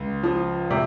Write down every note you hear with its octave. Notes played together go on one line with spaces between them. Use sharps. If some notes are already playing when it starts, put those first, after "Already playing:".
Already playing: C#2
F3
C3